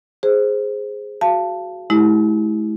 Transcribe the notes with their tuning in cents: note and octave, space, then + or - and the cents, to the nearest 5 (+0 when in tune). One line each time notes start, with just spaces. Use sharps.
G#4 +0 C5 +0
F#4 +0 F5 -25 A5 +5
A3 -45 E4 -25 G4 +0